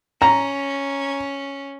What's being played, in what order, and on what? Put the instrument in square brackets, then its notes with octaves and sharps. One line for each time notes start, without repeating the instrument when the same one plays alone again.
[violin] C#4 [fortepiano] A#5